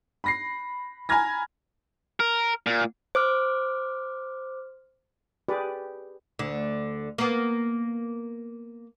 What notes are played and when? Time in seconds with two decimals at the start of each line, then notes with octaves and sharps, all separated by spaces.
0.24 B5 A#6 C7
1.09 G#5 A#5 B5 F6 G#6 A#6
2.20 A#4
2.67 A#2
3.15 C5 D6 F6
5.49 G4 G#4 B4 D5
6.39 D2 D3
7.18 A#3 B3